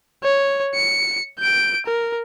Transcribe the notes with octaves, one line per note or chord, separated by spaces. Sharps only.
C#5
C#7
G6 D7
A#4